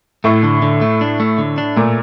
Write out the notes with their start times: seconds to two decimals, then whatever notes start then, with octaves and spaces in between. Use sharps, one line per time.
0.24 A2 A3
0.43 D3
0.62 D3
0.81 A3
1.01 D4
1.20 A3
1.38 D3
1.58 D4
1.76 A#2 A3